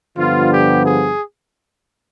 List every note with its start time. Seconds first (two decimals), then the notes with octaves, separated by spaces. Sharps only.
0.17 G2 D3 F3 B3 F4
0.51 G4
0.86 G#4